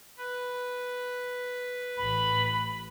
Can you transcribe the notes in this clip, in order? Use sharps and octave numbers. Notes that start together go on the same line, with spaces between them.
B4
A1 B5